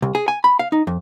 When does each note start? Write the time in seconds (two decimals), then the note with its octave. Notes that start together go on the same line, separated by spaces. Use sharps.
0.02 C2
0.15 G#4
0.28 G#5
0.44 B5
0.59 F5
0.72 D#4
0.87 F2